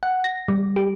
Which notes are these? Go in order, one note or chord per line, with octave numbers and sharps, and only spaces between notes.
F#5
A#6
G3
G4